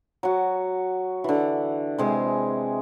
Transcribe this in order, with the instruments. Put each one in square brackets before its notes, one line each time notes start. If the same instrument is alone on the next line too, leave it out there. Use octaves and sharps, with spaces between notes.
[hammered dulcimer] F#3 F#4
D3 E3
C3 G#3 G#4 G#5